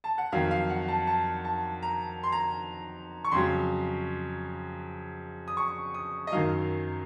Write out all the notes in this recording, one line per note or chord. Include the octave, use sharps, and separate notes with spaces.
A5
F#5
F2 D#3 F#3 F5
F5
F#5
A5
A5
A5
A#5
C6
A#5
C#6
F2 C#3 F#3 C6
D#6
C#6
D#6
D#5
F#2 D#3 F#3 F5